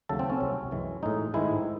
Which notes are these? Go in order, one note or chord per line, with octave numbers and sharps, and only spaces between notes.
D#2 C#3 F#3 A3 A4
C4
C#4
C2 C3 F#3
F#2 E3 G#3
A2 G#3 D#4
G#2 D#3 G#3 E4